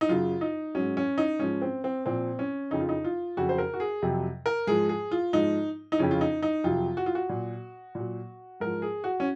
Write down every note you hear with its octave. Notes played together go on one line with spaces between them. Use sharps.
D#4
F#2 C#3 F#3 F4
D#4
G#2 F#3 C#4
C#4
D#4
G#2 F3 C#4
C4
C4
A#2 F3 C4
C#4
F2 C#3 F3 D#4
F4
D#4
F4
F2 C#3 F#3 F#4
C5
A#4
F#4
G#4
F2 C3 F#3
A#4
G#2 F3 G#4
G#4
F4
G#2 F3 D#4
D#4
F2 C#3 F3 C#4
F4
D#4
D#4
F2 C3 F#3 F4
F#4
F4
F#4
A#2 F#3
A#2
F#3
G#2 F3 A#4
G#4
F#4
C#4